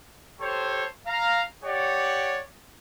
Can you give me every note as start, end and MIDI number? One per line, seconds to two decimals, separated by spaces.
0.39 0.85 67
0.39 0.85 69
0.39 0.85 72
0.39 0.85 73
1.07 1.43 77
1.07 1.43 82
1.64 2.39 67
1.64 2.39 73
1.64 2.39 74
1.64 2.39 78